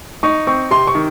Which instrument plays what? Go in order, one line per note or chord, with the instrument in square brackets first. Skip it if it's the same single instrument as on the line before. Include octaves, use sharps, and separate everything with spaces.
[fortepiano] D#4 [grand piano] C#6
[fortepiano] C4 [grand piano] C#6
[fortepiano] C3 [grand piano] C6
[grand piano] C#6
[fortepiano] D#3